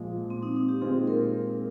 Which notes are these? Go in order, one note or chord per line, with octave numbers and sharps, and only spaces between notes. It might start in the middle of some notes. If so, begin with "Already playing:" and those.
Already playing: A#2 F3 G#3
C4
D#4
D#4
G4
A#2 G#3 C4 F4 G#4
A#4
A#4